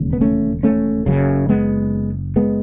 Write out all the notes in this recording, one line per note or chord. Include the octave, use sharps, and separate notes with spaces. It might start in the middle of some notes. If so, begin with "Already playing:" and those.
Already playing: E1 D#2 C#3
B3
A3 C#4
A3 C#4
F#1 F#2 C#3
G#3 B3
G#3 B3